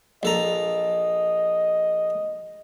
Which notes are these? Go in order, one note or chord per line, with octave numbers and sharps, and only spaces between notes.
A#1 A4 D#5 A#5